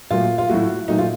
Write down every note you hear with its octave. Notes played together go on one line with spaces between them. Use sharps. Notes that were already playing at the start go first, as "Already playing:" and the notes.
A#2 F#3 A3 F4
F4
A2 F#3 A3 F#4
A#2 F#3 A3 D#4
F4